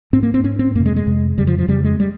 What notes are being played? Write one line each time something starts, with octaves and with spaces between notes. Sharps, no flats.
G#2 C4
A#3
C4
G#2 C#4
C4
F2 A#3
C3
G#3
G#3
F2 C3
F2 C#3 G3
F3
F3
F2 C#3 G3
G#3
G3